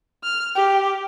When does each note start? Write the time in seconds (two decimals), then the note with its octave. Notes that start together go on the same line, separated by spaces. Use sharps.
0.24 F6
0.55 G4